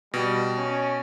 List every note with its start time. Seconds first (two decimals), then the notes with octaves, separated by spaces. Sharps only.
0.14 B2 G3
0.57 C#4